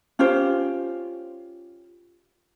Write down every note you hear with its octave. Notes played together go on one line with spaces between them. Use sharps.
C#4 F4 G4 C5